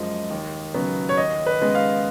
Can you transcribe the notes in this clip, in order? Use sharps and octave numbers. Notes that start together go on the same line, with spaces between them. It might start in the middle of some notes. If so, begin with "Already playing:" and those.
Already playing: F#2 F3 G#3 D#5
D#2
C#3 F#3 B3
C#5
D#2 D#5
B4
C#3 G#3 B3
F5